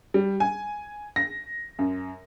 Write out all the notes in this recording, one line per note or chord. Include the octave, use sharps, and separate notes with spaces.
G3
G#5
A#6
F#2